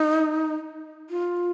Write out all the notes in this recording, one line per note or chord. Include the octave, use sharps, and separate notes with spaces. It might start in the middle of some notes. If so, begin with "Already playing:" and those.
Already playing: D#4
F4